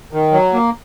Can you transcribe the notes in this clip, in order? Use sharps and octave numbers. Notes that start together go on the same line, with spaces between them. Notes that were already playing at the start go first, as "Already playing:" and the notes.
D#3
F#3
A#3